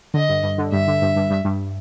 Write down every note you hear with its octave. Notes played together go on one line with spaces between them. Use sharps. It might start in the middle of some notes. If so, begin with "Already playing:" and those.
D3 D#5
G2
G2
D3
G2 E5
D3
G2
G2
G2
G2